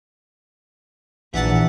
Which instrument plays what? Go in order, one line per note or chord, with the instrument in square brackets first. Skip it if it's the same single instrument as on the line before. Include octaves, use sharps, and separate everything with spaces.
[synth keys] A#1 A#2 [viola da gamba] E3 [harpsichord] E5 F#5 A5